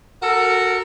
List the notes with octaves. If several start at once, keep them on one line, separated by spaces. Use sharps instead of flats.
F#4 A4 A#4